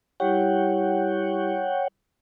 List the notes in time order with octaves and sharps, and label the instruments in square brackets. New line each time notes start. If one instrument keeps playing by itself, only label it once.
[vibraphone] G3 E4 G4 [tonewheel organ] C#5 F#5 G5